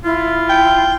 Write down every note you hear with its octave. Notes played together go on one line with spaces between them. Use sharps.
E4 F4
G5